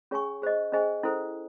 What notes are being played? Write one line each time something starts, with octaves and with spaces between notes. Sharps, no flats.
C#4 G#4 C#5 G#5 C#6
G#4 C5 D#5
C#4 G#4 C5 D#5 G#5
C#4 E4 A4 C5